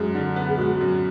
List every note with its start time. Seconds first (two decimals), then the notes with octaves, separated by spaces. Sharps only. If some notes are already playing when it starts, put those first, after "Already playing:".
Already playing: F#2 G#3 G#4
0.15 D3
0.36 B3
0.48 G#4
0.58 G#3 F#4
0.81 F#2